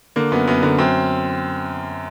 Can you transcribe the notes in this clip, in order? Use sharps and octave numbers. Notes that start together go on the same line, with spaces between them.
D3 A#3
F#2 B3
F#2 B3
D3
F#2 C4